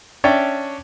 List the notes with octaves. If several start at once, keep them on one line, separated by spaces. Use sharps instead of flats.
C#4 D4 C#5 D5 E5 G5